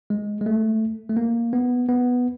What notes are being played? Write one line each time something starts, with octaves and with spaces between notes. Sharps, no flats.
G#3
G#3
A3
A3
A#3
B3
B3